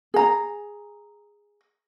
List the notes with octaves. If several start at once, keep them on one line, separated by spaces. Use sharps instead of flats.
G#4 A#5